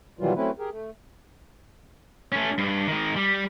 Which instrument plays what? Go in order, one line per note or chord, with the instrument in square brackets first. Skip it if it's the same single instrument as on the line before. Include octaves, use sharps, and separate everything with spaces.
[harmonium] B2 D#3 E3 F#3 G3 F4
F#3 A3 C4 C#4 E4 B4
G4 G#4 A#4
A3
[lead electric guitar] A3 C#4
G2
D#3 G#3
G3